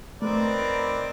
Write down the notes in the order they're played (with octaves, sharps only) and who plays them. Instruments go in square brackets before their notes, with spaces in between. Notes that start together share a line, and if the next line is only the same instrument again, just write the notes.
[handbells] A3 [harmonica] C4 D5 [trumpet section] D#4 A#4 B4